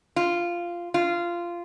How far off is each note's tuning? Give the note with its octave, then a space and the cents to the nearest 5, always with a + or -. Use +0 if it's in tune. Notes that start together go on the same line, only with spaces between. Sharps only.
F4 -10
F4 -15